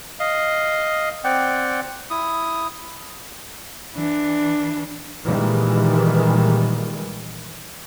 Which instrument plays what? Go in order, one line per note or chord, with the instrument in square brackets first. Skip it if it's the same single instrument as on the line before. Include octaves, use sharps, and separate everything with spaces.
[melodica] D#5 F5
C4 D5 F#5 G5
E4 D#6
[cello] E3 D4
[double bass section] A#2 D#3 E3 G3 G#3